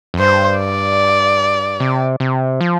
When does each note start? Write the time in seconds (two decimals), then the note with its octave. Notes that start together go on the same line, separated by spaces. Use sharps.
0.14 F2
0.19 G2 C5
0.59 D5
1.80 C3
2.20 C3
2.61 F3